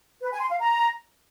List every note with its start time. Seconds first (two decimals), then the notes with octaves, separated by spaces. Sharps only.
0.22 B4
0.31 G#5
0.41 C6
0.50 F5
0.60 A#5